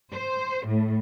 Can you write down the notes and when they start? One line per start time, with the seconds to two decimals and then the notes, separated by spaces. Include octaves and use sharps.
0.13 C5
0.68 A2